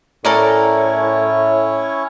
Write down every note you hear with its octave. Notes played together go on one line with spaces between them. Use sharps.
A2 C#4 E4 A4 A#4 C#5 D5